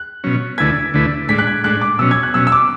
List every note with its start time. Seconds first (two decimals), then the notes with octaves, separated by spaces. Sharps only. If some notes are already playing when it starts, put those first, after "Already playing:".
Already playing: F#6
0.24 B2 F#3 C#4
0.58 D2 D3 A3 E4 B4 G#6
0.94 D2 D3 A3 E4 B4
1.28 A2 G#3 D4 B6
1.39 F#6
1.47 G#6
1.64 A2 G#3 D4 F#6
1.81 D6
1.99 B2 F#3 C#4 E6
2.11 G#6
2.23 F#6
2.34 B2 F#3 C#4 E6
2.47 E6
2.52 D6